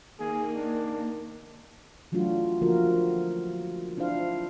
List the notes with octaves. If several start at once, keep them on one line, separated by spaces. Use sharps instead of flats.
D#3 A#3 G#4
D4
E3 F#3 A3 D4 F4 F#4
D3 F3 A#3 F4 F#4 A#4
D4 E4 F4 C5 F5